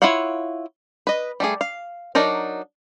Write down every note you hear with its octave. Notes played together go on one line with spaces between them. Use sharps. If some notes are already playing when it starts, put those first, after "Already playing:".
E4 F4 C#5 F5 F#5
B4 D#5
G3 A3 G#4
F5
F#3 D4 D#4 A#4